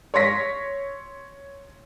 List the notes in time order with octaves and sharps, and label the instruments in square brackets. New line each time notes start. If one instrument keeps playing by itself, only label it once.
[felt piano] C#5 C6 A#6 B6